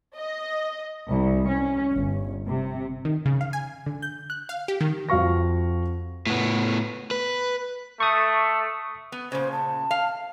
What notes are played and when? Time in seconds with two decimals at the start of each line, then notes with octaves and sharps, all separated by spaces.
0.16 D#5
1.09 C2
1.48 C#4
1.93 G1
2.49 C3
3.05 D#3
3.26 C#3
3.41 F5
3.53 G#5
3.86 D3
4.02 G6
4.30 F#6
4.49 F5
4.68 G4
4.81 D#3
5.09 F2 F#4 F5 C#6 A#6
6.27 A2 B3
7.11 B4
8.00 A3 C#6 D#6
9.12 B3
9.32 A#2 C#3 C5
9.52 A5
9.91 F5